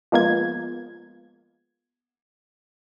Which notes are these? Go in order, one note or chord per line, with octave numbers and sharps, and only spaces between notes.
F3 G#3 A#3 B3 F4 G#6